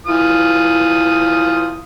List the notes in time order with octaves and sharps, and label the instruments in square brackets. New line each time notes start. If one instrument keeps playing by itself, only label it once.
[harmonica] E3 F4 D#6